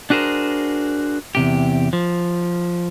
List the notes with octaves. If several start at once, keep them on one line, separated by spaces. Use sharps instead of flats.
D4 F#4 G#4 A#4 C5
E2 C3 G4
F3